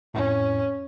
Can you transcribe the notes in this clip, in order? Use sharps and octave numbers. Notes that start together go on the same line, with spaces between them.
F2 A2 C#4